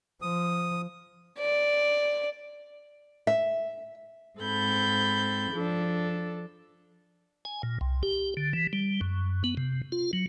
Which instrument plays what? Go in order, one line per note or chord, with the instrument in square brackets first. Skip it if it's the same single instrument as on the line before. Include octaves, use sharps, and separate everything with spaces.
[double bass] F3 [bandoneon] D#6
[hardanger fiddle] D5
[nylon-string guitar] E5
[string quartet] G#2 C4 A4 B5 G6
F3 D4 A4
[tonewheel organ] G#5
A#2
C2
G4
D3
E3
G3
F#2
B3
C3
F4
F#3